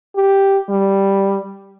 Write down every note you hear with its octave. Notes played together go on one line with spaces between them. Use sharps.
G4
G3